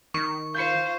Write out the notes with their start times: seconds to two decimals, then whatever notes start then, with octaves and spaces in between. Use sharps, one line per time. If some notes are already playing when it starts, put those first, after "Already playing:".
0.14 D#3 C#6
0.54 F4 C5 G6 G#6 C#7